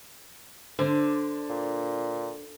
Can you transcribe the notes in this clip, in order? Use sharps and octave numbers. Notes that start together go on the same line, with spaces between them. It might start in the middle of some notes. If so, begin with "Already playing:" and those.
D3 D4 C5
A#2